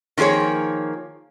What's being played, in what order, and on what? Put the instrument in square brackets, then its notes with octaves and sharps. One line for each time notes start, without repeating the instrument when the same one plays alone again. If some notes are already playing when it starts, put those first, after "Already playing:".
[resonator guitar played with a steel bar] D#3 F3 A#3 G#4 C#5